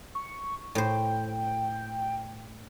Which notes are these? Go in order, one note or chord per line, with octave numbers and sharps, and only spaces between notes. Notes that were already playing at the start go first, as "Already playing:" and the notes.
C#6
A2 C5 G5